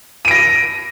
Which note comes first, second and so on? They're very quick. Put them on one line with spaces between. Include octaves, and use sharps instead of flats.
D#7 D7 A#6